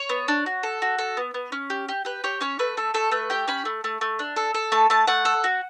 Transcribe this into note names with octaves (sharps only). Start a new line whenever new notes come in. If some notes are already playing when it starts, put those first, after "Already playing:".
Already playing: C#5
B3
D4
F#4
A4
F#4
A4
B3
B3
C#4
G4
G4
G4 B4
G4 C#5
C#4 C#5
A3 B4
A3 A4
A3 A4
A3 B4
G4 G5
C#4 B5
A3
A3
A3
D4
A4
A4
A3 A5
A3 A5
A3 F#5
A4
F#4